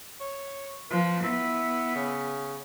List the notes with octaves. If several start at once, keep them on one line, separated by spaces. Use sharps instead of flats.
C#5
F3 B4
B3 E4
C#3